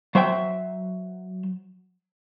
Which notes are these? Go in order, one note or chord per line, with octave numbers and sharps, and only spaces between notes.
F#3 C5 E5 G5